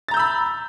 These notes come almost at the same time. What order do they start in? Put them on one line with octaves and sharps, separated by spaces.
A6 A#5 G6 E6 B5